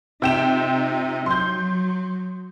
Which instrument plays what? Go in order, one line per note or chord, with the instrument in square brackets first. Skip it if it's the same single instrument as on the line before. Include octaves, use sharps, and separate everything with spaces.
[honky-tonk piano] C3 G5 E7 [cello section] D#4 F4
[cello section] F#3 [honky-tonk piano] C6 G6